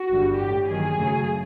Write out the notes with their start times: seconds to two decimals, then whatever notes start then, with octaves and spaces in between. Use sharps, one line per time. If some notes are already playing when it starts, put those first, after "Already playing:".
Already playing: F#4
0.11 G1 G2 D3 G3
0.40 A1 A2 E3 G4
0.68 G2 D#3 F#3 A#3 G#4
0.97 F#2 C#3 F#3 A3